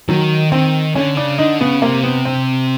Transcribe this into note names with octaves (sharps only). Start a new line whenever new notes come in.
D#3 F#3
D#3 C4
D3 C#4
C#3 D4
D3 D#4
C#3 B3
C3 A#3
B3
C4